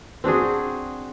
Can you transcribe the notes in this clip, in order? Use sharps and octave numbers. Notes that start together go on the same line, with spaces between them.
C4 D4 F#4 G#4